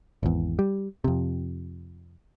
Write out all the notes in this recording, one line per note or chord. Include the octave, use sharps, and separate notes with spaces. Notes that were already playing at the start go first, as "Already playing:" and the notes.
G#1 E2
G3
F2 C3